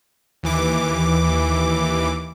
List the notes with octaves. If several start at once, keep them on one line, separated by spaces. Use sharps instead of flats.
D#2 E3 D6